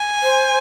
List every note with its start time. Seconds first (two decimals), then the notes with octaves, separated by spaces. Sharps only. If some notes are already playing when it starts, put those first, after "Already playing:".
Already playing: G#5
0.23 C5